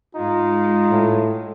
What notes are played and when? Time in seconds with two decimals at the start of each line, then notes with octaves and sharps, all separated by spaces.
0.15 G#2 G#3 D#4 F4
0.89 A2